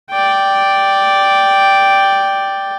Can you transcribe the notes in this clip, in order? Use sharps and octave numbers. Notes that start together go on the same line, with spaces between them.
D5 G5